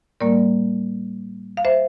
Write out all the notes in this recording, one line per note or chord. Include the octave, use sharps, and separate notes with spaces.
A2 G3 A#3 A#4 D5
F5
C5 E5